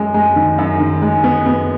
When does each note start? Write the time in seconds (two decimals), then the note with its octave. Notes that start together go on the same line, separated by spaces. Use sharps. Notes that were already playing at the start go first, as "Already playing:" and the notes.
Already playing: F#2 G#3
0.14 G#3
0.36 D#3
0.58 F#2
0.80 D#3
1.02 G#3
1.24 B3
1.46 B3